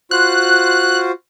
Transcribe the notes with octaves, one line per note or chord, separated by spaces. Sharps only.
F4 F#4 C5 F#6